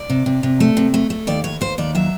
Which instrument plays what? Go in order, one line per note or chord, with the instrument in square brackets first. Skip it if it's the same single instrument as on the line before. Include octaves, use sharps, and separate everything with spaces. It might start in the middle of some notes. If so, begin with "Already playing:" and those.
Already playing: [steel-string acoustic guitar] D5
C3
C3
C3
A3
C3
A3
A3
D#2 D5
D#2 C#5
D#2 C5
D#2 D5
F#3 E5